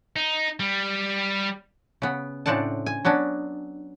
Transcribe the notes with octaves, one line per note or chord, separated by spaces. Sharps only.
D#4
G3
C#3 B3
A2 C#3 C4 D4 F#5 A5
G#5
F#3 B3 C#4 D4